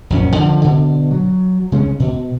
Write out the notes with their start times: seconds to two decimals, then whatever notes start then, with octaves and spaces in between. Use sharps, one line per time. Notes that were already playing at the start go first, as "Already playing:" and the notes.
0.10 A#1 F#2 C#3 C#4
0.36 D3 D#3 F3
0.61 B2 D3
1.11 F#3
1.72 C#3 G#3 C4 C#4
2.00 B2